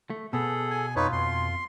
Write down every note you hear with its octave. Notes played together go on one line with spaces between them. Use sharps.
A3
B2 B3 G#4 A4
G#5
F2 D#4 F4 B4 C#5
F2 C6